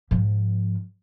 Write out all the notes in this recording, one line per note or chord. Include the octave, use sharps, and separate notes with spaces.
G#2 F3